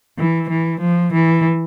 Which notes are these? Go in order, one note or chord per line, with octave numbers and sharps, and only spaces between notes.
E3
E3
F3
E3